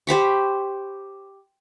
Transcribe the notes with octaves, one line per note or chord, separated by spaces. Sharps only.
G4 C5 B5 C#6